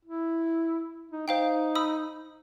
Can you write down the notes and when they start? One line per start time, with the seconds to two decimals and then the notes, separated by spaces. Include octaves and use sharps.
0.05 E4
1.11 D#4
1.28 D#4 C5 F5 G5
1.75 B5 D#6 E6